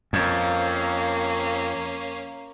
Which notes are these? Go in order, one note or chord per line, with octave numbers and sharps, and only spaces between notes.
F2 A#3 C#4